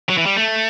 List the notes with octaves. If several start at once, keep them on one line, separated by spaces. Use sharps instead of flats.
F#3
E3
G3
A3